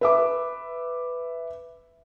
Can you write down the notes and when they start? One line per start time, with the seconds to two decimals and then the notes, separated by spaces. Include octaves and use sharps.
0.01 B4 E5 D6